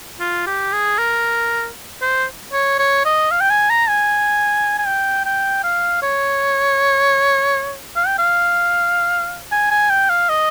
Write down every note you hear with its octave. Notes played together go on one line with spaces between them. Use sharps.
F4
G4
G#4
A#4
C5
C#5
C#5
D#5
F5
G5
G#5
A#5
G#5
G#5
G5
G5
F5
C#5
F5
G5
F5
G#5
G#5
G5
F5
D#5